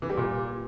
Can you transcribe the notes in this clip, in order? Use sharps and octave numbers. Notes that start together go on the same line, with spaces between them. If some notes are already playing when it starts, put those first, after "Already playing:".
E3
G3
A#2